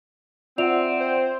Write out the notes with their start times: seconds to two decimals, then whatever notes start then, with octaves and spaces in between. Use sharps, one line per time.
0.58 C4 F4 D5 E5 F#5 F7
1.00 C5